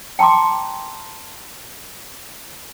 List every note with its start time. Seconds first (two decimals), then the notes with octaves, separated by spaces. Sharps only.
0.19 G5 A5 A#5 C6 D6